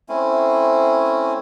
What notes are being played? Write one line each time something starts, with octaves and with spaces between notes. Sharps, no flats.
A3 C4 C#4 E4